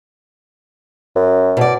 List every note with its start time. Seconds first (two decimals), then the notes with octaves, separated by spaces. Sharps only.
1.16 F#2
1.57 B2 D5